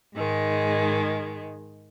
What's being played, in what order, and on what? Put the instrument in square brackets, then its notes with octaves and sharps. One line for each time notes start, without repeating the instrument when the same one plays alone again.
[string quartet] G#2 D#3 G#3